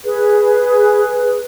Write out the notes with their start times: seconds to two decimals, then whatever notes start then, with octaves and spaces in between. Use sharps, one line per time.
0.03 G#4 B4